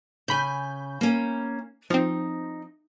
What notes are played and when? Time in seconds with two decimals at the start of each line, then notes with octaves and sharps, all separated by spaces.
0.28 C#3 G#5 B5 G6
1.01 A#3 C#4
1.90 F3 C4 D#4